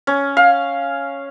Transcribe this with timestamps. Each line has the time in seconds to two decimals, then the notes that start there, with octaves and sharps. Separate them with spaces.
0.07 C#4
0.37 F5